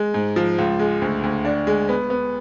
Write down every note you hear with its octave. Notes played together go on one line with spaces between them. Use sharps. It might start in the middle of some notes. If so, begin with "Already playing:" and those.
Already playing: G#3
G#2
F3
C#2
G#3
D2
D2
D4
G#3
B3
B3